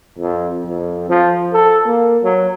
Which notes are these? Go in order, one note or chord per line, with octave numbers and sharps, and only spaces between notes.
F2
F2
F3
A4
A#3
F#3